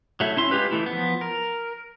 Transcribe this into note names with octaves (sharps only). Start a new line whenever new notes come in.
F#3 A3 E4
C#4 E4 C6
G#3 F4 G4 B4
E3 A3 E4
F3 B3
A#4